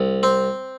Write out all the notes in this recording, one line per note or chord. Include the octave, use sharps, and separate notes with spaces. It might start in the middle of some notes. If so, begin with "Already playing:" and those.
Already playing: C2
C4